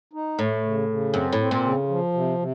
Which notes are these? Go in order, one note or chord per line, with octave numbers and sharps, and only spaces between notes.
D#4
A2 A3
C#3
C#3
F#2 C4
A2
C4
A#2
C#3
F3
C3
C3